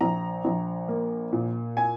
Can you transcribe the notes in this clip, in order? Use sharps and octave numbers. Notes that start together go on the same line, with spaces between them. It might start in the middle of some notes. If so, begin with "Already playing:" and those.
A#1 A#5
A#1
A#3
A#2
G#5